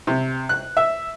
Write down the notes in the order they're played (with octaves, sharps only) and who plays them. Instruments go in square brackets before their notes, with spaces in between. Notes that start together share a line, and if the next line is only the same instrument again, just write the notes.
[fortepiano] C3
F#6
E5